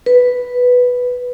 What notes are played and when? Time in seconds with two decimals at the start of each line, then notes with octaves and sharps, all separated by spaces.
0.06 B4